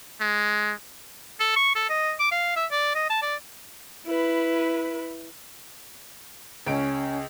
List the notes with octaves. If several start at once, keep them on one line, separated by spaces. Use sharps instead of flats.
G#3
A4
C#6
A4
D#5
D6
F5
E5
D5
D#5
A5
D5
E4 B4
C#2 C#4 D7